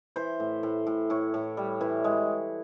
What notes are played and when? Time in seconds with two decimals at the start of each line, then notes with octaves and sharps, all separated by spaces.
0.16 E3 C5
0.40 A2
0.63 A2
0.87 A2
1.10 A2 C#5
1.34 A2
1.57 G3
1.81 E3
2.04 G#3